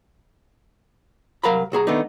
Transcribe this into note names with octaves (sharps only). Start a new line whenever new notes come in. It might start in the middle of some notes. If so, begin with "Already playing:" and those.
C2 F#3 A#4 F5 A#5 B5
C2 F#4 G#4 A#5
D#3 A3 B3 D4 D#4